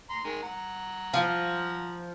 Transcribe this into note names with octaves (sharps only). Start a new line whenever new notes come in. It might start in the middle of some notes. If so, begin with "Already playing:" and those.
A#5 C6
D#3 G#3
F#5 A#5
F3